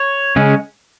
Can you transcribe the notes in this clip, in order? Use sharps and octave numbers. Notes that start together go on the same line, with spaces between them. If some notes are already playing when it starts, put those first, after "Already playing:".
Already playing: C#5
C#3 G#3 C#4